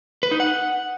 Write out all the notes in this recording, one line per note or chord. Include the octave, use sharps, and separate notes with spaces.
B4
D#4
F#5